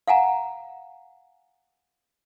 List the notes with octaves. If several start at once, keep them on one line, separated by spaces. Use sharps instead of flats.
F5 F#5 G#5 A#5